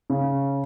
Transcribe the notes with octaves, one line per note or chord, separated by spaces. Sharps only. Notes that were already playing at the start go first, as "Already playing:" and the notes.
C#3